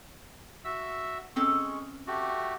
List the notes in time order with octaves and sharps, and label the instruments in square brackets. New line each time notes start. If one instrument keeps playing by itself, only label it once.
[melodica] F#4 E5 E6
[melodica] G#3 C#6 [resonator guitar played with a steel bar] C4 C#4 A4
[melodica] A3 F#4 G4